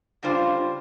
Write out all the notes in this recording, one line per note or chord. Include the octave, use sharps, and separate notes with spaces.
C#3 G3 D4 F4 C5